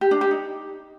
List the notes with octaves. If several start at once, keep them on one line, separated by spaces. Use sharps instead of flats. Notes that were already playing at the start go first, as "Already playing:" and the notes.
G4
D4
G4
D#4